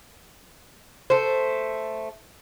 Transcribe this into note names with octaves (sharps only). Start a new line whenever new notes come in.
A3 C5